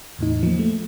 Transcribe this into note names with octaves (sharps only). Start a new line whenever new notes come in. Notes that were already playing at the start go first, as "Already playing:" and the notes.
E2 A2 D#4
F3 A#3
A3